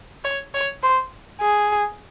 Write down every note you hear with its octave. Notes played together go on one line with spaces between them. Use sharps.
C#5
C#5
C5
G#4